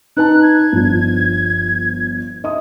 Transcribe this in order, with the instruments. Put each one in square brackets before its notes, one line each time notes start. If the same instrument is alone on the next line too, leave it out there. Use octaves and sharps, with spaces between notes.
[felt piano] D#4 B4 A5 [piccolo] F#6
[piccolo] G#6
[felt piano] G1 F3 D4
D#5 E5 D#6